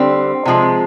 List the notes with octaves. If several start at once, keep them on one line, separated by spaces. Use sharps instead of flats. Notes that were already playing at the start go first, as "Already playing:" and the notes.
Already playing: D3 G3 C4
C3 F3 G#3